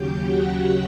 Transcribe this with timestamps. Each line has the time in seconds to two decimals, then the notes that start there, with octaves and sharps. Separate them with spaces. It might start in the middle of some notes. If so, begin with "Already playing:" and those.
Already playing: D#2 C#3 F#3 G4 G5
0.27 F#4 F#5